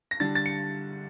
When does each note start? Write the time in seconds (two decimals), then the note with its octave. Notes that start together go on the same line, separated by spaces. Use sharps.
0.11 A#6
0.20 D3 G3 D4 A6
0.35 A6
0.46 C#7